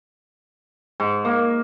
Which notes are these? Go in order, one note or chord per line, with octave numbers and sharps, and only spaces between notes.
G#2
A#3